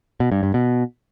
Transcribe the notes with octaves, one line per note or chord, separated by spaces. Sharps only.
B2
G2
G2
B2